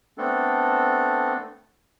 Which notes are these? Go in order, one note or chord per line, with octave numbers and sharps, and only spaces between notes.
A3 B3 C4 D4 A4